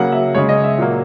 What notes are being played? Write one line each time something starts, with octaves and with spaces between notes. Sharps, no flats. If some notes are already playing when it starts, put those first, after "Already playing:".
Already playing: C#3 F#3 A#3 F#5
E5
C#3 G#3 C#5
D#5
E5
A#2 F#3 A#3